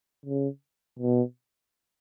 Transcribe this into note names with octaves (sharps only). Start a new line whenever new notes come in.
C#3
B2